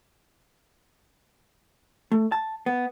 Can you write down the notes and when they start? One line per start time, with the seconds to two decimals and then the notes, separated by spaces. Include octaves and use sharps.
2.12 A3
2.32 A5
2.66 B3